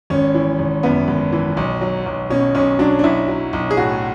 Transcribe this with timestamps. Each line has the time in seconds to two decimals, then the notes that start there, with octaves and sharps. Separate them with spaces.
0.10 G#1 C#4
0.34 E3
0.59 G#1
0.83 F#2 B3
1.08 G#1
1.32 E3
1.57 B1
1.81 F#3
2.06 B1
2.30 B2 C#4
2.55 B1 C#4
2.79 F#3 D4
2.99 D4
3.04 B1 E4
3.28 F#3
3.53 B1
3.71 G#4
3.77 A2 F#4